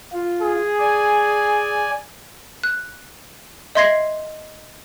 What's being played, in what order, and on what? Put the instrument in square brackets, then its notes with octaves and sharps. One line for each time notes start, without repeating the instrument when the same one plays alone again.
[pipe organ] F4
[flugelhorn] G#4
[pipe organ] D5 G#5
[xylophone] F#6
D#5 E5 C6 G#6 A#6 C7